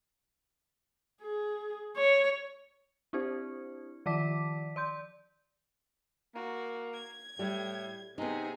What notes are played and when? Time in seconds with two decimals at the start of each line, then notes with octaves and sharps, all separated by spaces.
1.22 G#4
1.96 C#5
3.13 C4 D4 E4 G4 C5
4.06 D#3 F3 D5 A5 D6 B6
4.76 D5 C6 G6
6.35 A#3 F#4
6.94 G#6
7.39 A2 G3
8.18 C3 B3 D#4 G#4